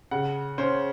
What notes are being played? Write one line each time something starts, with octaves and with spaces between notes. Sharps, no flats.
C#3 F#5
C#4 C5